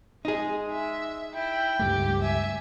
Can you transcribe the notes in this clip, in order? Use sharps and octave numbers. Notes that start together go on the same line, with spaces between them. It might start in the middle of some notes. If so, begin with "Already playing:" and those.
G#3 D#4 G#4
E5
E4 G5
C#2 G2 A3 G4
E5 G#5